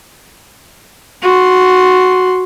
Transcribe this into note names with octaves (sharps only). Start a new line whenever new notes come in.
F#4 C6